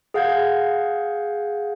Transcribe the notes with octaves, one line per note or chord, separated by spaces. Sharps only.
G#4 F5 F#5 G6 G#6